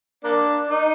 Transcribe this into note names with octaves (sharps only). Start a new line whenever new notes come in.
A#3 D4
D#4